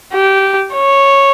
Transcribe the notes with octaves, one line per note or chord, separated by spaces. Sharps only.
G4
C#5